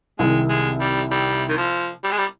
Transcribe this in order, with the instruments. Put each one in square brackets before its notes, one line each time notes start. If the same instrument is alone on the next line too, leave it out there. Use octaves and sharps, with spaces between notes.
[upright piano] C2 C3 D#3 [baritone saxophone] G#3
[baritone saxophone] G#3
G3
G3
D#3
F3
G3
G#3
G3